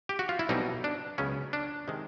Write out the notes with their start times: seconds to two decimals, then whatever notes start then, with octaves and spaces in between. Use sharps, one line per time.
0.09 G4
0.19 F#4
0.29 F4
0.39 E4
0.49 B1 B2 G3 C4 D#4
0.84 D4
1.18 C#2 C#3 F#3 B3 C#4
1.53 D4
1.88 C3 D#3 G#3